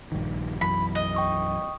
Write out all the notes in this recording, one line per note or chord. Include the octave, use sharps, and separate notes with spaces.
A#1 G2 D#3
B1 F#2 E3 B5
D#5
G5 C#6 D#6